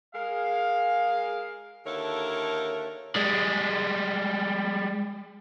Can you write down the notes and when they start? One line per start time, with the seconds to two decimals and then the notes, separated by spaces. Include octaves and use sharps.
0.15 G#3 G#4 A#4 F5
1.86 D#2 D3 E4 A4 A#4 C#5
3.16 G3 G#3